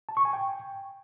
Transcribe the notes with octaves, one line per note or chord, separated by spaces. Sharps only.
A5
C#6
G#5
G5